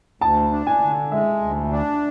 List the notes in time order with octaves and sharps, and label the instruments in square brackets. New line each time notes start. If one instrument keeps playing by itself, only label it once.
[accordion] D2 [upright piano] A5
[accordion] D4
[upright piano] G#5
[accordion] D3
[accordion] G#3 [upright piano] E5
[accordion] D2
D4